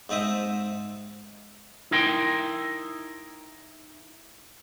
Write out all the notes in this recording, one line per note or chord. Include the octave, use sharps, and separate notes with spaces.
G#2 C4 D#5 E5 D#6
D#4 E4 A#4 G5 C6